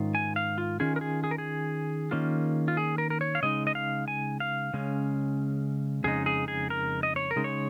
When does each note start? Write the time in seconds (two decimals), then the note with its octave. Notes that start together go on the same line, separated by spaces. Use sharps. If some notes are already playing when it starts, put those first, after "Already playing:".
Already playing: G#2 D#3 C#4 F4
0.15 G#5
0.36 F5
0.58 F4
0.80 D#3 C#4 F4 G#4
0.96 A#4
1.01 G#4
1.24 G#4
1.31 A#4
1.38 G#4
2.11 D#3 A#3 C#4 F4
2.68 F4
2.77 G#4
2.98 A#4
3.10 A#4
3.21 C#5
3.35 F5
3.43 C#3 G#3 D#4 D#5
3.67 D#5
3.75 F5
4.08 G#5
4.40 F5
4.74 C#3 G#3 C#4
6.04 F2 C#3 G#3 D#4 G#4
6.26 G#4
6.48 G#4
6.70 A#4
7.03 D#5
7.16 C#5
7.31 A#4
7.36 C#3 G#3 D#4
7.44 C#5